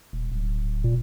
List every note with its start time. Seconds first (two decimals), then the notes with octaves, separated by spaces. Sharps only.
0.13 D#1
0.31 D1
0.84 A#2